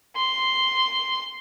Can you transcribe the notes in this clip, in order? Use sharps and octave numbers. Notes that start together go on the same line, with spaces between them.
C6